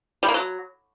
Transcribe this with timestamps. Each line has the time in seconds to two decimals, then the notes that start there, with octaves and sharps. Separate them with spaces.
0.23 G3
0.28 A#3
0.34 F#3